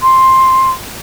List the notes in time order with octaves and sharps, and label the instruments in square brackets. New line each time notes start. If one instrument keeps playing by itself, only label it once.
[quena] C6